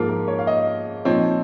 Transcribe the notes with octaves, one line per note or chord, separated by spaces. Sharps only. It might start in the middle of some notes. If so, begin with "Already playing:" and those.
Already playing: G#2 F3 A#3 F4
A#4
C#5
F5
D#5
A#2 F3 C4 D#4 C#5